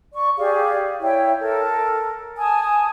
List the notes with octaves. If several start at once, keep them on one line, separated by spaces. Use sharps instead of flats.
D5 C#6
G4 G#4 D5 F5
E4 C#5 E5 G5
A4 A#4
G#5 A5 D#6